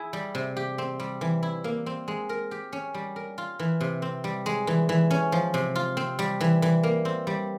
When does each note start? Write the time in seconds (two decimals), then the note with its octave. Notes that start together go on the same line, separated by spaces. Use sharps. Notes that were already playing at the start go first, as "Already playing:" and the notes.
Already playing: E4 G#4
0.13 G3
0.35 C3
0.57 G4
0.78 C4
1.00 G3
1.21 E3
1.43 E4
1.64 A#3
1.86 C4
2.08 G#3
2.29 A#4
2.51 G4
2.73 C#4
2.94 G3
3.16 A#4
3.38 F4
3.59 E3
3.81 C3
4.02 C4
4.24 G3
4.46 G#3
4.67 E3
4.89 E3
5.11 C#4
5.32 F3
5.54 C3
5.76 F4
5.97 C4
6.19 G3
6.41 E3
6.62 E3
6.83 A#3
7.05 C4
7.27 G3